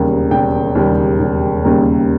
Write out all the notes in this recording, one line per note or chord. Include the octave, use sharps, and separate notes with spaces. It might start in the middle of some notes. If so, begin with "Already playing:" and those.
Already playing: E1 D#2 C#3 G3 A#3
E1 G5
D#2 C#3 G3 A#3
E1
D#2 C#3 G3 A#3